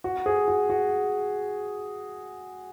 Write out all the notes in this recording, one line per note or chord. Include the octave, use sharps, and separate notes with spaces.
F#4
G#4
F#4
F#4